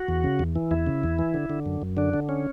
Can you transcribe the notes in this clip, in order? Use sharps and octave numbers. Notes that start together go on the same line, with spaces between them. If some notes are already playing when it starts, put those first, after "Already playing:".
Already playing: F#4
E2
C#3
E2
E3
E2 E4
C#3
E2
E3
D3
D3
F#2
F#2
D3 D4
D3
C#4